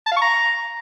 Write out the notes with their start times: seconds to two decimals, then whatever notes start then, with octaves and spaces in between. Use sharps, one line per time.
0.06 A5
0.11 F5
0.17 C#6
0.22 A#5